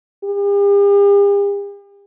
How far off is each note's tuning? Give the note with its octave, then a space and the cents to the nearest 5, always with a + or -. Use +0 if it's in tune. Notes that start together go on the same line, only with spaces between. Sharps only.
G4 +45